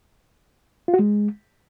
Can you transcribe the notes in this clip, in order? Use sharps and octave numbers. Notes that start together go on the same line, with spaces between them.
F4
F#4
G#3